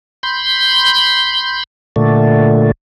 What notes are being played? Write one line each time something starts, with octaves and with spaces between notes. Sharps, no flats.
B5 C6 G6
A#2 D3 A3